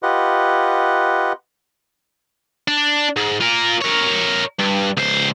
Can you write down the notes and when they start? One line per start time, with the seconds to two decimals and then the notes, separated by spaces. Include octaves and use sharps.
0.03 F4 G4 B4 D#5 F#5
2.68 D4
3.16 G#2
3.41 F4 A#4
3.82 A#4 C#5
4.59 G2
4.97 C#2 C5